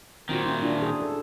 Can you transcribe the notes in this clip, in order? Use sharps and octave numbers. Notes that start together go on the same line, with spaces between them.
A#2 D#3 C4 F4 F#4
C#4 E4
D4 E4 F4
G#4
A4